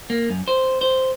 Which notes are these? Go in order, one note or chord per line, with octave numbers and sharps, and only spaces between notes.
A#3
F#2
C5
C5